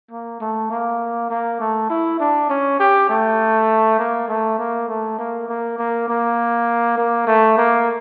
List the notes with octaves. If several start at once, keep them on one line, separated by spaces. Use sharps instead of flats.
A#3
A3
A#3
A#3
A3
E4
D4
C#4
G4
A3
A#3
A3
A#3
A3
A#3
A#3
A#3
A#3
A#3
A3
A#3